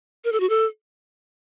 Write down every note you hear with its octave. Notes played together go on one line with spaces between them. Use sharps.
A#4
A4
F#4
A4